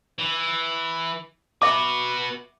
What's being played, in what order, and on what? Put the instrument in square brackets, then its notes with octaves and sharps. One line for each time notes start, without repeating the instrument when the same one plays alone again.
[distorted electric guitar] E3
[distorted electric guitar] F#4 B4 [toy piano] E5 D6